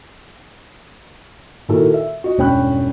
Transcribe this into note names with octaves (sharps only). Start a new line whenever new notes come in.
A#2 D#3 E4 F#4 A4 A#4
E5
F#4 D#5
E1 G2 C#4 G5 B5 F#6